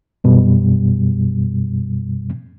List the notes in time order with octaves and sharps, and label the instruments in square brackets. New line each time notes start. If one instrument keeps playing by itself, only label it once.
[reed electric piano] F#2 B2 G3